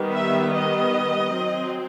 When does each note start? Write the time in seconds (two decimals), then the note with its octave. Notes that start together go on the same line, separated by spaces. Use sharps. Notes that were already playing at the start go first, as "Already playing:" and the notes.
Already playing: D#3 G3 B3
0.11 E5
0.53 D#5
1.36 F#3 C4